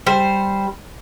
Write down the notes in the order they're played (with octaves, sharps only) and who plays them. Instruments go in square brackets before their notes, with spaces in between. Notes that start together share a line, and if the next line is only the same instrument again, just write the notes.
[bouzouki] G3 C5